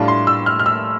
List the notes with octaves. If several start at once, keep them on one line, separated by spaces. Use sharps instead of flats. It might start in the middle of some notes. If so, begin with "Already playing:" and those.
Already playing: A2 G3 D4 F4 A5
C6
E6
F6
F6
E6